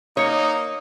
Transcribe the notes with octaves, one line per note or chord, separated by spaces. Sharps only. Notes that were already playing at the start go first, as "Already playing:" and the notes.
A#3 D#4 C#5 D#6 C#7